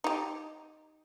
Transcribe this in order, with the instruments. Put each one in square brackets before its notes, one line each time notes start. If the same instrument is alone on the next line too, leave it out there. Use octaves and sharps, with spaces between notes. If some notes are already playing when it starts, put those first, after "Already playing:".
[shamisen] D#4 G4